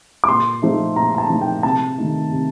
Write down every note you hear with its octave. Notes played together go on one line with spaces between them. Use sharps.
D6
A#2 C6
F3 A3 D#4
A#2 A#5
A#5
A5
F3 A3 D#4
G5
C3 A5
D#3 A3 D#4
C3